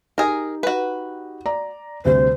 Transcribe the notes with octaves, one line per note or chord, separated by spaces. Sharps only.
D#4 G4 G#4 A#4
F#4 B4
D5 A#5
D2 C3 G3 C5